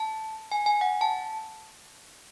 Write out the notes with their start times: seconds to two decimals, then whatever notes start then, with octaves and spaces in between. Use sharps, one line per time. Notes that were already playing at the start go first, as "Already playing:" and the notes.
Already playing: A5
0.52 G#5
0.66 G#5
0.81 F#5
1.01 A5